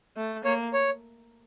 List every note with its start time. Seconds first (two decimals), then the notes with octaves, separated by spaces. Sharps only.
0.17 A3
0.45 A#3 C#5
0.73 C#5